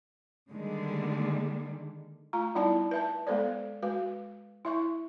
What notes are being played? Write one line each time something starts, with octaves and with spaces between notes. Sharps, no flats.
D3 D#3 G3 G#3 A#3
A3 F4 A#5
G3 B3 D#4 E4 D5 A5
B4 E5 A5
G#3 B3 A4 C5 D5
G#3 F#4 B4
E4 E5 C#6